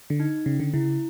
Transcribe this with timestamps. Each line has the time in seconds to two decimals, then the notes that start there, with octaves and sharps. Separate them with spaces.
0.10 D3
0.20 D#4
0.46 C#3 C#4
0.60 D3
0.74 C#3 E4